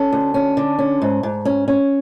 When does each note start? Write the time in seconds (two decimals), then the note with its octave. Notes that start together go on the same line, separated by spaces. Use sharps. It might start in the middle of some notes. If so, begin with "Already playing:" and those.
Already playing: C#4 A4
0.12 D2
0.34 C#4
0.57 D3
0.79 C#4
1.02 G#2
1.23 G#2
1.45 C#4
1.68 C#4